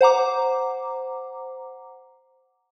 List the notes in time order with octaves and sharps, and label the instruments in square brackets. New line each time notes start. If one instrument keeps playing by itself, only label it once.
[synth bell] C5 F#5 A#5 D6